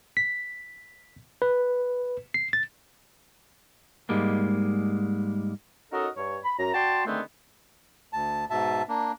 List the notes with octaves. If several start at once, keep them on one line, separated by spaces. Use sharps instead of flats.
B6
B4
C7
A6
G#2 G3 G#3 A#3
C#4 D#4 F#4 A4 A#4 D#5
G2 C#5
B5
F#2 A#5
F#4 D5 G5 A5 C6
D3 D#3 G#3 A3 B3 C4
D2 A5
G#2 B2 E5 A5
A#3 D4